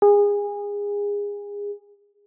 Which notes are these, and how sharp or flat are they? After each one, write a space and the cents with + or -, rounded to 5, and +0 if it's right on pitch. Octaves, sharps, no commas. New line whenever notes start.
G#4 -25